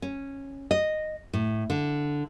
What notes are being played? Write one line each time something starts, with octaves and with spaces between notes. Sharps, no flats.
C#4
D#5
A2
D3